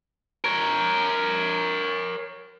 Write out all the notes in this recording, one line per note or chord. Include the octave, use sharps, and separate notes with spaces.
A#4 C#5